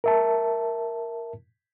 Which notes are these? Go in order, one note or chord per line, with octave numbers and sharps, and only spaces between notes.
A#4 E5 A5